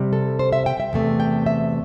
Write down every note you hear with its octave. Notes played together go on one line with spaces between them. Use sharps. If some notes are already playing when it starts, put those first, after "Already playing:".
Already playing: C3 G3
A4
C5
E5
G5
E5
E2 C3 A3
G5
E5